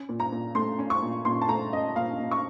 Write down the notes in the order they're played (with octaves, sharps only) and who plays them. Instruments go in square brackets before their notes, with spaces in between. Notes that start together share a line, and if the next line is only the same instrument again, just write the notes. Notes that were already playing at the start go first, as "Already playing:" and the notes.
Already playing: [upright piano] C#4
A#2
A#5
A#2
A3 C6
C#4
C#6
A#2
A#2 C6
A5
A3 A#5
C#4 D#5
A#2 F5
A#2
C#6